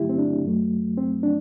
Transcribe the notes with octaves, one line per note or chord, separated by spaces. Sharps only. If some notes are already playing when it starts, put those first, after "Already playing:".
Already playing: G2 D3 F#3 A3 E4 G4
C4
D4
F#2 F#3 A3
C4
D4